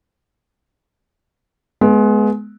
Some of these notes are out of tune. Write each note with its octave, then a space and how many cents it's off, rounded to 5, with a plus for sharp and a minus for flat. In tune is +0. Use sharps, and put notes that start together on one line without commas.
G#3 +25 B3 +0